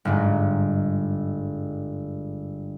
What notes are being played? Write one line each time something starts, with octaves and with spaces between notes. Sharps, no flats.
G1 G#2